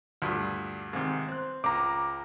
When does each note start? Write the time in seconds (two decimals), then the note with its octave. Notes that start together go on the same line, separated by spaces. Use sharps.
0.22 D2 G2 A#2
0.93 G#2 C3 D#3
1.29 C4 F#6
1.64 C#2 A#5 D6